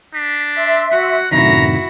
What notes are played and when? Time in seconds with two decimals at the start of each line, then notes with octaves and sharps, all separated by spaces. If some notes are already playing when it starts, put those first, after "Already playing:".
0.14 D4 B6
0.55 E5 C6 B6
0.92 F#4 F#5
1.32 F#2 A2 C3 D#3 E4 F#4 A#5